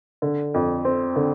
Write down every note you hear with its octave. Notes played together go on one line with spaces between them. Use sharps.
D3
F2
C4
D3